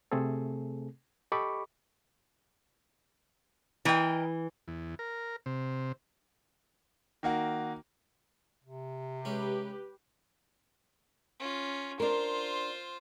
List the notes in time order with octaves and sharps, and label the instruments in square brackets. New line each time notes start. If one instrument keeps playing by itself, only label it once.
[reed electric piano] C3 A3 C4 G#4 A4
G4 A4 D#5 B5 C#6 D6
[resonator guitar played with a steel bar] E3 [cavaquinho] A#4 D#5 G5
[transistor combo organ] E2
A#4
C3
[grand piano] D#3 A#3 F#4
[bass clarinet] C3
[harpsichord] G#3 C#4 [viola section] G4 B4
[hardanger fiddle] C#4 F4
[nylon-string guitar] D4 A#4 [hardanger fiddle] F4 C5